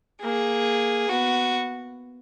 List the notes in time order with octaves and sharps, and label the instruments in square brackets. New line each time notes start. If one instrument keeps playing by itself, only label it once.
[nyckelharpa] A#3 [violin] G#4
[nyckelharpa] B3 [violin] F#4